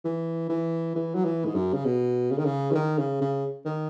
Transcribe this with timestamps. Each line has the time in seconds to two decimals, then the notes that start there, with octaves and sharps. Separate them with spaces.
0.05 E3
0.50 E3
0.96 E3
1.15 F#3
1.25 E3
1.46 G#2
1.55 F#2
1.73 C#3
1.85 B2
2.31 C#3
2.38 D#3
2.45 C#3
2.71 E3
2.75 D#3
2.98 C#3
3.21 C#3
3.65 D#3